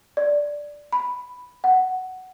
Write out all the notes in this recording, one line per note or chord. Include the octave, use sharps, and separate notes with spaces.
D5
B5
F#5